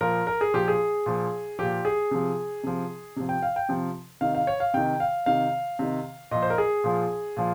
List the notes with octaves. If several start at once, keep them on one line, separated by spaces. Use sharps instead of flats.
A#2 F3 A#4
A#4
G#4
A#2 F3 G4
G#4
A#2 F3
A#2 F3 G4
G#4
C3 F3
C3 F3
C3 F3
G5
F5
G5
C3 F3
C3 D#3 F5
F5
C#5
F5
C3 D#3 G5
F5
C3 D#3 F5
C3 D#3
A#2 F3 D#5
C5
A#4
G#4
A#2 F3
A#2 F3